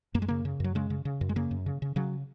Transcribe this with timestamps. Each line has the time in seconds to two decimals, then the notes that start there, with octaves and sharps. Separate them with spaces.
0.14 F#2 A#3
0.22 G#3
0.28 C#3 A#3
0.45 C#3
0.60 F#2 F#3
0.75 C#3 G#3
0.90 C#3
1.05 C#3
1.21 F#2
1.29 G#3
1.36 C#3 A#3
1.51 F#2
1.66 C#3
1.82 C#3
1.96 C#3 F#3